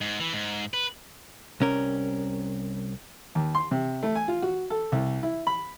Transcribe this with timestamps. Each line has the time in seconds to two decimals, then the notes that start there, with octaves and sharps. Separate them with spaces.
0.01 G#2
0.20 E3
0.33 G#2
0.74 B4
1.60 C2 C#4 A#4
3.35 D#2
3.55 C6
3.71 C3
4.03 A3
4.15 G#5
4.28 F4
4.42 F#4
4.70 A4
4.92 C2
5.23 E4
5.47 B5